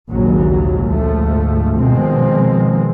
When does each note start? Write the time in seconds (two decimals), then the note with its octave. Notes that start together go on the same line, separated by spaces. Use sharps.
0.10 A#1 D#2 G#2 C#3 F#3
0.85 D2 G#2 F3 A3
1.76 B2 D#3 F3 G#3 C4